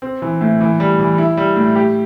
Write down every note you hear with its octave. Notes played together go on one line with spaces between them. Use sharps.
C4
E3
A2
E3
G3
E3
E4
G3
A2
G4